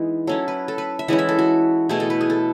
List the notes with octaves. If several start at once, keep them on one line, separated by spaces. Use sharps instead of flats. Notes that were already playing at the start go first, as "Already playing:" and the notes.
Already playing: E3 G#3 B3 D#4
F#3 C#4 E4 A4
B4
A4
B4
E5
E3 G#3 C#4 E4 F#5
E5
A4
F#4
B2 A3 E4 G#4
A4
B4
G#4
A4